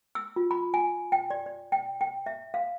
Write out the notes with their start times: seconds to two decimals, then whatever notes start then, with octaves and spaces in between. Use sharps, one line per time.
0.15 E6
0.36 F4
0.51 B5
0.74 G#5
1.12 G5
1.30 D5
1.46 D5
1.72 G5
2.01 G5
2.26 E5
2.54 F5